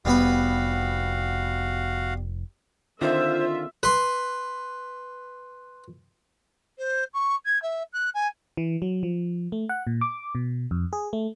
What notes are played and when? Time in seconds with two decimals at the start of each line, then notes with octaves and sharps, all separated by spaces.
0.05 F1 G3 B3 F#4 B4 F5
3.01 D3 D#3 C4 F4 C5 E5
3.83 B4 C6
6.78 C5
7.13 C#6
7.46 G#6
7.62 E5
7.93 F#6
8.14 G#5
8.57 E3
8.82 F#3
9.03 F3
9.52 A3
9.69 F#5
9.87 A#2
10.01 D6
10.35 B2
10.71 F2
10.93 G#4
11.13 A3